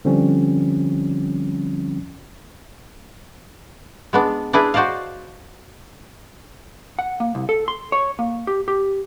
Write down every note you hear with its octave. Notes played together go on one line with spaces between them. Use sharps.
D3 F3 G3 C4 C#4
G#3 B3 D4
D4 E4 G#4 B4
F#4 C5 D5 D#5 F5
F#5
A#3
C2
A4
C6
C#5
A#3
G4
G4